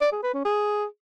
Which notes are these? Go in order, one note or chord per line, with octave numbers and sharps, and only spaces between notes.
D5
G#4
B4
C#4
G#4